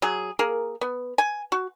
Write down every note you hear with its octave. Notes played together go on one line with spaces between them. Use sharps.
F#3 G#4
A#3 G#4 A#4
B3
G#5
F#4